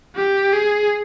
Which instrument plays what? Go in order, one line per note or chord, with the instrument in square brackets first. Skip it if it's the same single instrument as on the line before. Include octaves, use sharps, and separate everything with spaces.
[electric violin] G4
G#4